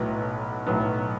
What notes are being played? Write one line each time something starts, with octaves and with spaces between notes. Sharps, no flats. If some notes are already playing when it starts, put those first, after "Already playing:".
Already playing: B1 A2 F#3 B3
B1 A2 F#3 B3